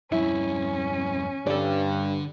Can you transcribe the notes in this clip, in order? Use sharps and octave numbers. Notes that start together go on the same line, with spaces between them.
E2 G2 C#4 E4
G2 D3 D4 A4 D5